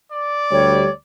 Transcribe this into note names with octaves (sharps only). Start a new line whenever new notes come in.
D5
D2 G3 C#5